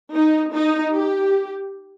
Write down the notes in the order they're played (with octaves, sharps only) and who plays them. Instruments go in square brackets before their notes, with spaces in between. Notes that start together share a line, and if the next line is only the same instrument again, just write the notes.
[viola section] D#4
D#4
G4